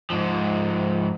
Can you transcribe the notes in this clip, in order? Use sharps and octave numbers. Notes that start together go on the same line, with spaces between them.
G#2 F3